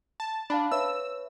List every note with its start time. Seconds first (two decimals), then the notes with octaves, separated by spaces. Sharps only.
0.20 A5
0.50 D4 F5 A5 B5
0.72 B4 C#5 E5 E6